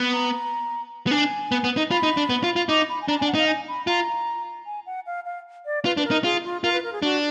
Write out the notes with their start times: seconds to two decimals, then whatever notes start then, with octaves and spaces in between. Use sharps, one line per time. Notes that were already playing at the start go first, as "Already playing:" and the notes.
Already playing: B3
0.13 A#5
1.07 B3
1.11 D4 G#5
1.52 B3
1.64 B3
1.77 D#4
1.91 F4 B5
2.03 D#4
2.17 D4
2.30 B3
2.44 F4
2.56 F4
2.69 D#4 D6
2.89 B5
3.02 G#5
3.08 D4 A#5
3.19 G#5
3.22 D4
3.28 F#5
3.34 D#4 F5
3.48 G#5
3.68 B5
3.87 F4 A#5
4.66 G#5
4.86 F#5
5.06 F5
5.25 F5
5.66 D5
5.85 F4 B4
5.97 D4 B4
6.05 A#4
6.11 D#4
6.24 F4 G#4
6.44 F4
6.63 F4 A#4
6.73 B4
6.84 A#4
6.93 G#4
7.02 D4 F#4